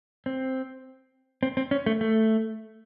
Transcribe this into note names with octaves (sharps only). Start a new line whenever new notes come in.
C4
C4
C4
C#4
A3
A3